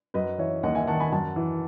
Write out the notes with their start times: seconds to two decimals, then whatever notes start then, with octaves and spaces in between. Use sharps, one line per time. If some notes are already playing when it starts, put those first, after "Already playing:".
0.14 F#2 B4 D#5
0.38 E3 C#5 E5
0.63 D#2 D#5 F#5
0.75 E5 G#5
0.87 D#3 F#5 A5
1.00 G#5 B5
1.12 F#2 F#5 A5
1.36 E3